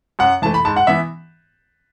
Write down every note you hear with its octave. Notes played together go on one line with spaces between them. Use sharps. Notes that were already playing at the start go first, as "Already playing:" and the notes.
F#2 F#5
E3 A3 A5
B5
G#2 A5
F#5
E3 B3 E5